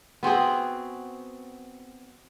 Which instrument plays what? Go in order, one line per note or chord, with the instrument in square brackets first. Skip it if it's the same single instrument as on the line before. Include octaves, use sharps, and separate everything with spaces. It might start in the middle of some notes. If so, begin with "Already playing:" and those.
[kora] B3 C4 F#4 G#4